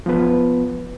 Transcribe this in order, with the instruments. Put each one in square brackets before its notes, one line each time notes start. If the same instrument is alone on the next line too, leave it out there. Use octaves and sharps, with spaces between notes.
[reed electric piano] F3 B3 B4